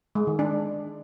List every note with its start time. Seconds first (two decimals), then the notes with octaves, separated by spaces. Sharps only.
0.15 G#3
0.27 D#3
0.39 D4